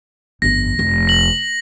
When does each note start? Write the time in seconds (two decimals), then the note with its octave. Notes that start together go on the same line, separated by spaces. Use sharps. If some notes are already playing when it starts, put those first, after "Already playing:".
0.42 G1 F2 A#6
0.79 F1
1.07 A#6 F#7